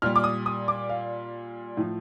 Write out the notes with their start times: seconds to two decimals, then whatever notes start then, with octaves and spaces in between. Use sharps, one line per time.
0.02 A#2 G3 F6
0.16 D6
0.24 D#6
0.46 D#6
0.68 D6
0.89 F5
1.77 A2 F3